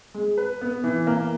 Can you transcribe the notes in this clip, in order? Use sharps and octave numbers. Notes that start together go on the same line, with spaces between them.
G#3
B4
B3
E3
A#3